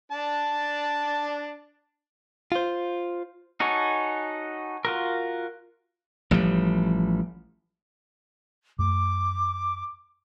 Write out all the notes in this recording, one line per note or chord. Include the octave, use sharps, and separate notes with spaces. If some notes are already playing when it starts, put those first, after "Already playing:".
D4 A5
F4 C5
D#4 F#4 A4 C#5 G#5
F4 F#4 A#4
A1 F3 G3
F#2 A3 D6